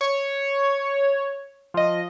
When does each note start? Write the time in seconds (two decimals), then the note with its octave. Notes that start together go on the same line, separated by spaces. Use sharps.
0.01 C#5
1.74 F3 D#5